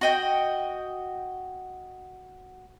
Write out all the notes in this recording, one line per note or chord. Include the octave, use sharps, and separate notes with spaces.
F#4 D#5 G5